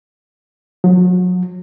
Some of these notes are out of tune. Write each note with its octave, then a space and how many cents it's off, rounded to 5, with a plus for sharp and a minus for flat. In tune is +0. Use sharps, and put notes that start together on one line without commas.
F#3 -35